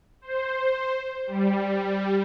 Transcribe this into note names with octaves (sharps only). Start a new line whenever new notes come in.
C5
G3